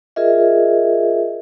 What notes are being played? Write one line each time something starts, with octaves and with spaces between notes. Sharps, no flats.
F4 G#4 A#4 D#5 E5